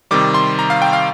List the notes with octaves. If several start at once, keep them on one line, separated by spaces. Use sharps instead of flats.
C3 D#3 G3 D6
C6
A#5
F5
G5
F5